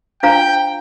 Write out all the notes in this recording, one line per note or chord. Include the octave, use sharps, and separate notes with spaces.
D4 F4 C5 F5 G5 A#5